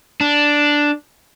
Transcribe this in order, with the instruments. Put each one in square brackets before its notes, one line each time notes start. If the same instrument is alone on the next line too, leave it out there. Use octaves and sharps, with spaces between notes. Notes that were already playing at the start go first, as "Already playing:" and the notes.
[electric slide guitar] D4